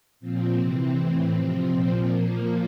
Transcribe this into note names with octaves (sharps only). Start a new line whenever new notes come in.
A#2 F3 C4
C3 E3
A2 E3 C4
C3 F3
A#2 F3 C4
A#2 F3 A#3